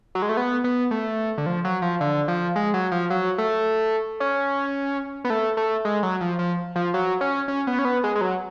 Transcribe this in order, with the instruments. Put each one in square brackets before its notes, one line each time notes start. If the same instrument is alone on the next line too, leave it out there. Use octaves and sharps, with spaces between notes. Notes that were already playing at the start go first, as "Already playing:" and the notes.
[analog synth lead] F#3
G#3
A3
B3
B3
A3
D3
F3
F#3
F3
D3
F3
G#3
F#3
F3
F#3
A3
C#4
B3
A3
A3
G#3
F#3
F3
F3
F3
F#3
C#4
C#4
B3
C#4
B3
G#3
G#3
F#3